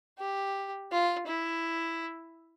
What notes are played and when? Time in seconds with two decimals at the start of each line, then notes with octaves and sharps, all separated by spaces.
0.19 G4
0.91 F4
1.27 E4